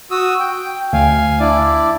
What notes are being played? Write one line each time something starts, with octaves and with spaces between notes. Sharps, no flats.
F#4 D#6 E6
G5
D2 F5 G#5
D4 E4 D5